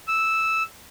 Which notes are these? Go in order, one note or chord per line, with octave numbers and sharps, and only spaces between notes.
E6